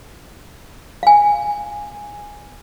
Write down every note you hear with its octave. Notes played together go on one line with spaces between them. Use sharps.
F5 G#5